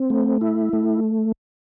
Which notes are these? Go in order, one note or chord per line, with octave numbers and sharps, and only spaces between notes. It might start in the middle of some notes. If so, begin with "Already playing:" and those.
Already playing: C4
A3
E4
A3